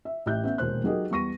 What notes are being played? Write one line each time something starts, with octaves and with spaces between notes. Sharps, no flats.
E5
A1 G4 E5 F#6 G6
B3 C#4 E5
E1 D#2 A#2 C5 F#6
F#3 D#4 G4 G#4 A#4 D#5
E2 G3 C#6 A#6 D#7